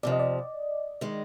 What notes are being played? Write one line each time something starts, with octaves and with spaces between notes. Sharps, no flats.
F2 C3 F3 D5
D#5
D5
D#3 G#3